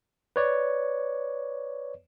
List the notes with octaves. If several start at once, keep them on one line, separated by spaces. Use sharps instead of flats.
B4 C#5 D5